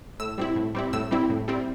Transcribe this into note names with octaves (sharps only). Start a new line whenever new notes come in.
A2 E6
G3 C4 E4
A2
G3 C4 E4
A2 E6
G3 C4 E4
A2
G3 C4 E4